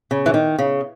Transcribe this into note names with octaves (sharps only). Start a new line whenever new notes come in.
C#3
E3
D#3
C#3